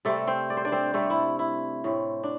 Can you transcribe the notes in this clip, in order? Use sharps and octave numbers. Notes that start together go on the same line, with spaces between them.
C3 G3 A3 C4 A4
C4 C5
D5
C5
D4 D5
C4 C5
C3 G3 A3 C4 A4
E4
E4
A2 A3 C4
D4